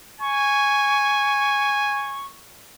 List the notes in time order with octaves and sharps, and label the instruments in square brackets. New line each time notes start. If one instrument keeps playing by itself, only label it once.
[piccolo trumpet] G#5 [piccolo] C#6